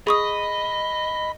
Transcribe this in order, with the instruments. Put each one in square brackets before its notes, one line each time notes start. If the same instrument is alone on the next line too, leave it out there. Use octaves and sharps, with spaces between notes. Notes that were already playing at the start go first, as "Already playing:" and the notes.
[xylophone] G#4 C#6 D#6 [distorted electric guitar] D#5 [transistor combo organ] B5